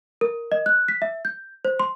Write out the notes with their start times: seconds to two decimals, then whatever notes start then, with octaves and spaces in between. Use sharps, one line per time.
0.21 A#4
0.52 D#5
0.66 F#6
0.88 B6
1.02 E5
1.25 G6
1.65 C5
1.80 C6